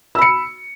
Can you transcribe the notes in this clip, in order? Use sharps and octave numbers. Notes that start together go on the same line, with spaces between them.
B5 E6 C#7